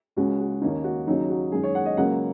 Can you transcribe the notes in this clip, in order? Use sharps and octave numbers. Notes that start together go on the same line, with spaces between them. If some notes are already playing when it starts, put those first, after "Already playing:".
C#2 C#3 G#3 C#4 F#4
F#4
D#2 D#3 A#3 C#4 D#4
F#4
D#2 C#3 F#3 D#4
F#4
F#2 D#3 G#3 G#4
C#5
F#5
D#5
C#2 C#3 F#3 A#3 F#5